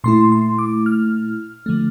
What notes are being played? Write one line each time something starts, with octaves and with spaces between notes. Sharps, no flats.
A#2 A3 E4 C6
C6
D6
F6
D3 F3 A3